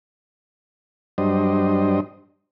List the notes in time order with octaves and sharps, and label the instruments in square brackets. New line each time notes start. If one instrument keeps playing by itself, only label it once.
[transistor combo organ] G2 F#3 G3 D4 C5 D#5